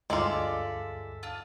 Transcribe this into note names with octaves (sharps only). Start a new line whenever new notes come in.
D2 G2 G#3 F4 A4 D5 E5
D4 F4